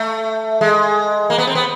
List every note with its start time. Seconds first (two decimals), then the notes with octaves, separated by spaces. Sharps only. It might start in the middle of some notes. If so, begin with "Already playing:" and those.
Already playing: A3
0.61 G#3
1.30 A#3
1.38 B3
1.47 C4
1.55 B3